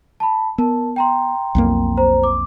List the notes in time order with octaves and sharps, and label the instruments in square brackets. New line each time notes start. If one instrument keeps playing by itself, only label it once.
[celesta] A5 B5
[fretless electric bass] B3 [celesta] A#4 A5
[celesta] G5 A#5 C6
[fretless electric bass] B1 F2 A#3
[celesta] C5 A#5
D6